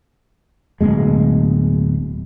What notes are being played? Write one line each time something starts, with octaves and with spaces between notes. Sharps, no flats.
D1 E2 B2 G#3